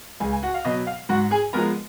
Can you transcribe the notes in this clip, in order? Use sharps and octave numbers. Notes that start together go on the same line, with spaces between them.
C#2 G#4 G#5
G#5
F#4 F#5
F5
B2 F#3 B3 D#5
F5
G#2 F#4 F#5
G#4 G#5
F3 G#3 B3 A#4 A#5